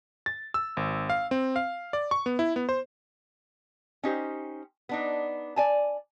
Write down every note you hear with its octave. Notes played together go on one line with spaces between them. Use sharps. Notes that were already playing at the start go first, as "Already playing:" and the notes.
A6
E6
G#1
F5
C4
F5
D5
C#6
B3
E4
B3
C5
C#4 D#4 G4 C5
B3 D4 D#4
D5 G#5 A5